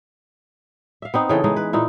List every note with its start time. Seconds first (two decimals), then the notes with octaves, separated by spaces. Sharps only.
1.02 E5 F5
1.14 B3 C4 D#4
1.29 C#3 E3 A4 G5
1.44 E3 G#3 D#4
1.56 B4
1.73 A#2 D#4 E4